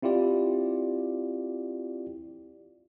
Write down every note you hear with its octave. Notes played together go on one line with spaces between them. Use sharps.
C4 E4 F4 G4 D5